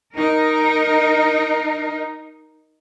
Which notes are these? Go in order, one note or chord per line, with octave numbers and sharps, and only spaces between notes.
D#4 A#4